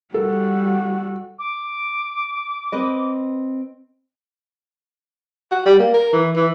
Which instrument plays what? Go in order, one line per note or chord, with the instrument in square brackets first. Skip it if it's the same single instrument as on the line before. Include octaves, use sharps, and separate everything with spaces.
[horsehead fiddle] G3 F#4 [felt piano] A4
[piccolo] D6
[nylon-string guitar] C4 B4 D#5
[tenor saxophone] F#4
G3
A#3
A#4
E3
E3